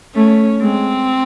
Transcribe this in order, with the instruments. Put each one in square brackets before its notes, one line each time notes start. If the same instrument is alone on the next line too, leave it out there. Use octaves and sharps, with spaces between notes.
[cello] A3 [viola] C#4
[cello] G#3 [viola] C4